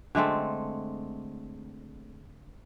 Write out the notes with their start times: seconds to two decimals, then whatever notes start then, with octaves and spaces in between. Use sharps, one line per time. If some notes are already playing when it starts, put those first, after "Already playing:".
0.15 D3 G#3 A3 C4